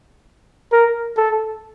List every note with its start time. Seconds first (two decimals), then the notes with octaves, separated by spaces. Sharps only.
0.72 A#4
1.17 A4